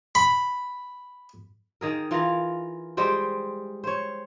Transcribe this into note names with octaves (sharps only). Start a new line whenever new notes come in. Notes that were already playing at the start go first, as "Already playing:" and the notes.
B5
D#3 G#4 A#4
E3 F4 A#4
G3 G#3 C5 G5
C5 C#5